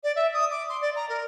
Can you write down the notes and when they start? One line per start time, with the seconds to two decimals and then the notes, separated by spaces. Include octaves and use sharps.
0.03 D5
0.15 E5
0.33 D#6
0.50 D6
0.69 C6
0.81 D5
0.95 A#5
1.09 A#4